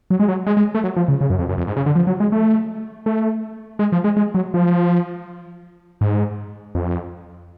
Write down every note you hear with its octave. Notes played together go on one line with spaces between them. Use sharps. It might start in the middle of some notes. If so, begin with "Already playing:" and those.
F#3
G#3
F#3
G#3
G#3
A3
F#3
F3
C#3
C#3
F#2
F2
F#2
F2
G#2
C#3
D3
F3
F#3
G#3
A3
A3
G#3
F3
G#3
G#3
F#3
F3
G#2
F2